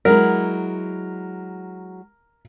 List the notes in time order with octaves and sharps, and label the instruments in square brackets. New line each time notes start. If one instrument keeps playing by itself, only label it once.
[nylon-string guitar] F#3 G#3 E4 [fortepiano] A#4